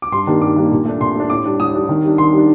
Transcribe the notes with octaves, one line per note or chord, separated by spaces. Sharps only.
D6
G2 C6
D#3 G3 A#3 D4
G2 D6
D#3 G3 A#3 D4
A#2
A3 D4
A#2 C6
A3 D4
A2 D6
G3 D4
A2 D#6
G3 D4
D#3
G3 D4
D#3 C6
G3
D4